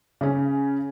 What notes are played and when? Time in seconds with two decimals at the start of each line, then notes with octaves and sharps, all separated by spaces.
0.21 C#3 C#4